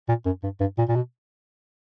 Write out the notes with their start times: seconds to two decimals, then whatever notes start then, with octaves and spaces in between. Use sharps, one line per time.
0.08 A#2
0.25 F#2
0.43 G2
0.60 G2
0.78 A#2
0.88 A#2
0.95 B2